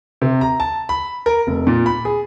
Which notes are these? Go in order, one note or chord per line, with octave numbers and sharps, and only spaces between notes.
C3
A#5
A5
B5
A#4
F1
A#2
B5
G#4